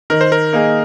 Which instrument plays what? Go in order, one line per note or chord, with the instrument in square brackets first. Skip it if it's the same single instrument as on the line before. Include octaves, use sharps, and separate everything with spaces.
[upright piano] D#3 [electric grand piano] A#4
[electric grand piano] C5
A#4
[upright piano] A#3 D#4 G#4